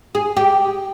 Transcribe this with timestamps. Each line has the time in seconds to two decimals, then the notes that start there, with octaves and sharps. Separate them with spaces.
0.15 G#4
0.37 G4